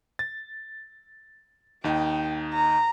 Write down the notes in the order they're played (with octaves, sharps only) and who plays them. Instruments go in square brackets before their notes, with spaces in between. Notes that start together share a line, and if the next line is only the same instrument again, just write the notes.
[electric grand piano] A6
[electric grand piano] D#2 D#4 [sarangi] G5
[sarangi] A#5